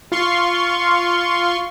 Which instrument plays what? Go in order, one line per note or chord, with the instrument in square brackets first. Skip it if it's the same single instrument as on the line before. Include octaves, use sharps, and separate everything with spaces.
[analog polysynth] F4 F5 C6 C#6